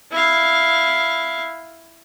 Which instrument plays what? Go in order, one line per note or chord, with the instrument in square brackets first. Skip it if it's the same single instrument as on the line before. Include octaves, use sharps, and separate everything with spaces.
[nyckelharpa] E4 F5